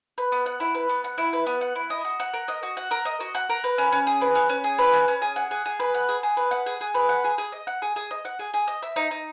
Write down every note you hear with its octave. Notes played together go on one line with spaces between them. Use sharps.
B4
B3
F#5
E4
B4
B3
F#5
E4
B4
B3
F#5
E4
D#5
F#4
F#5
A#4
D#5
F#4
F#5
A#4
D#5
F#4
F#5
A#4
B4
C#4
C#4
G#4
B4
C#4
C#4
G#4
B4
C#4
C#4
G#4
F#5
G#4
G#4
B4
F#5
G#4
G#4
B4
F#5
G#4
G#4
B4
F#5
G#4
G#4
D#5
F#5
G#4
G#4
D#5
F#5
G#4
G#4
D#5
E5
D#4
D#4